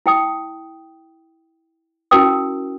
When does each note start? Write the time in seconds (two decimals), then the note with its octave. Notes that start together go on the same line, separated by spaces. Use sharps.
0.06 E4 G5 D#6
2.11 C#4 E4 F#4 A#4 G5 D#6